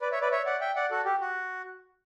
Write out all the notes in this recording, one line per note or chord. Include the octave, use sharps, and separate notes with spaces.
B4 D5
C#5 E5
B4 D5
C#5 E5
D5 F#5
E5 G5
D5 F#5
F#4 A4
G4
F#4